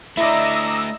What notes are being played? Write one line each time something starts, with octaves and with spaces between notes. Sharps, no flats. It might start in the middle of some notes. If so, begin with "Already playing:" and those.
A3 D4 E4 D5 D#5 A#5 E6 A#6